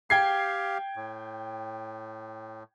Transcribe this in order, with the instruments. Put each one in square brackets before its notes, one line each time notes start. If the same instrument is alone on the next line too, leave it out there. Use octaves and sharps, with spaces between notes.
[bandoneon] G4 F5 [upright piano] G5 G#6 C7
[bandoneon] A2